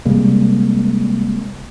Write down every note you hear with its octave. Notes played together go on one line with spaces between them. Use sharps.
C3 G3 G#3 A#3